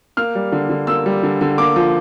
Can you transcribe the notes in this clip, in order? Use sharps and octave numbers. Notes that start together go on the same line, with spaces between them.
A#3 F6
G3
D3
D3
A#3 E6
G3
D3
D3
A#3 D6
F3